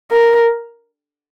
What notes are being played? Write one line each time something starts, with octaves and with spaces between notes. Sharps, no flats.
A#4